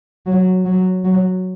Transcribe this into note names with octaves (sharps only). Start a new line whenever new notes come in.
F#3
F#3
F#3